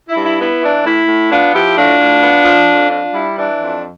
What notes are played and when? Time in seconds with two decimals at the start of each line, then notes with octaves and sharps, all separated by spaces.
0.09 E4
0.17 G2
0.24 E4
0.39 B3 E4
0.62 E3 D4
0.85 A2 E4
1.08 A2
1.31 B3 D4 F4
1.53 F3 E4 G4
1.76 A2 D4 F4
2.00 A2
2.23 B3
2.45 F3
2.68 F2
2.91 D4
3.14 G3 E4
3.38 E3 D4
3.61 F2